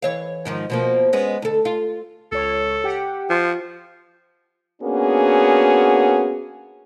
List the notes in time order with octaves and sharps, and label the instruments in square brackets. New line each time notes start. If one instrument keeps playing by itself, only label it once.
[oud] E3 C#5 F5
G#2 D#3 F3
B2 F3 A#3
G#3 B3 C#4
D2 A4
F4
[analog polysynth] C#2 C#5 [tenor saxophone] A4
[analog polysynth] G4 F#5 G5
[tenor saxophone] F3 [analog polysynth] F4
[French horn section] A#3 B3 C#4 D4 F#4 G#4